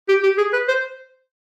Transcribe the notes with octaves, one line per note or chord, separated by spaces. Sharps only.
G4
G4
G#4
B4
C5